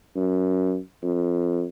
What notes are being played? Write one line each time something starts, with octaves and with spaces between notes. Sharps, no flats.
F#2
F2